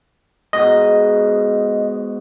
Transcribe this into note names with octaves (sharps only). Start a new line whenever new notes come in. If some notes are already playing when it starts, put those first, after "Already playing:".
G#2 B2 D#5